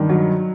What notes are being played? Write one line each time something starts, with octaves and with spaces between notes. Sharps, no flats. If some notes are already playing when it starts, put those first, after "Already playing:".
Already playing: G2 D#3
F#3